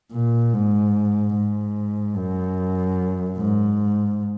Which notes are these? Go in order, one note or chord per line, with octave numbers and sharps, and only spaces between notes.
A#2
G#2
G#2
F#2
G#2